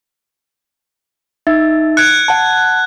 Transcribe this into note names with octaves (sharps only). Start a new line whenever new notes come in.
D#4 E5 A6
F#6 G#6 C#7 D7
F#5 A5